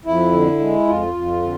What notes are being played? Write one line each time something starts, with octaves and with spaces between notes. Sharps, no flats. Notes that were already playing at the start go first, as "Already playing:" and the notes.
F2 E4
D3
G#3
F2 F4
F2
D3